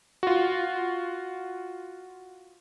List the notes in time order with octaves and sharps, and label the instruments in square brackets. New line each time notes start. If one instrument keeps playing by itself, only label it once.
[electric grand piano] F4 F#4